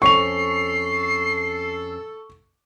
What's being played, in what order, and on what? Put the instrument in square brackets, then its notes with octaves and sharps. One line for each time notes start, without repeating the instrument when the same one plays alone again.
[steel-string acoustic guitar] F2 C#4 [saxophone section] A4 [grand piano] C#6 F7 [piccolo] C7